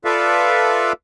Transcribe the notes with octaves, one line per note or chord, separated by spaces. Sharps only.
F4 A4 B4 D5 E5 F5